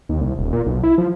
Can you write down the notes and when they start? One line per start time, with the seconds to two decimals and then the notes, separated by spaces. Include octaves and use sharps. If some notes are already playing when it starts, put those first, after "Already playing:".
0.09 D#2
0.21 C2
0.38 D#1
0.53 A#2
0.66 B1
0.83 E4
0.98 F3